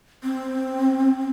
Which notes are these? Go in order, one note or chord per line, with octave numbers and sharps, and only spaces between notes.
C4